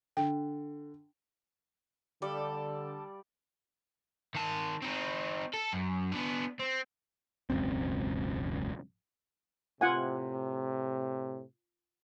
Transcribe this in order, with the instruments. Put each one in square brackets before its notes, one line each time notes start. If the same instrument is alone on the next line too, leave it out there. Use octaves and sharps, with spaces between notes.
[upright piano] D3 [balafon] G5
[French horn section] D3 [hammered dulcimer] G3 [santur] G4 D5 F5 [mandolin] A4
[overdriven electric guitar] D#3 A5
C4 D#4
A4
F#2
B3 D4
C4
[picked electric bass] E1 C#2 F#2 C4
[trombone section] A2 C3 [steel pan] F4 F#5 G#5